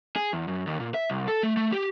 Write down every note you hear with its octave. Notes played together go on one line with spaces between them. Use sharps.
G#4
E2
F#2
D#2
A#2
E5
C2
A4
A3
A3
G4